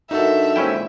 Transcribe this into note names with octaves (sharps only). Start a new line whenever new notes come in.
G2 D4 D#4 F#4 A4 A#4 E5
A#2 G#3 C#4 E4 C5 G5